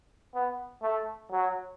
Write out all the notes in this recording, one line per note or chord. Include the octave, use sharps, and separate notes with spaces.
B3
A3
F#3